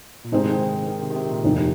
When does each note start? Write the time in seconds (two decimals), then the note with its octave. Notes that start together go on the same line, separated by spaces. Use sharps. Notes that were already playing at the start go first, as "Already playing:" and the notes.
0.25 A#2
0.32 G#2 C3 G#3 C4 D#4 G#4
0.46 D#3
0.87 D#3
1.02 C3
1.10 D#3
1.16 C3
1.30 A#2
1.44 F1 D#2 D#3